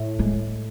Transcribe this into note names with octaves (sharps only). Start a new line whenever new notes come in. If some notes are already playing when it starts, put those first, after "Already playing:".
Already playing: A2
G#3